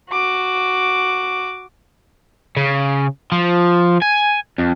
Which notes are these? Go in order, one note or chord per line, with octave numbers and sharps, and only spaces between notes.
F#4 D6
C#3
F3
G#5
F2